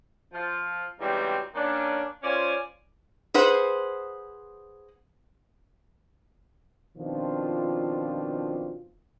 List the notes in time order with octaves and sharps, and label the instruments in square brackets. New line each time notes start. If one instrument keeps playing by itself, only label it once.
[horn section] F3 F4
G#2 C#3 E3 G3 C4 F#4
D#3 A#3 C#4 D4
C#4 F4 C5 D5 G#5
[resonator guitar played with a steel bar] G#4 B4 C5 F#5
[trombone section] B2 D#3 F3 C4 D4 F4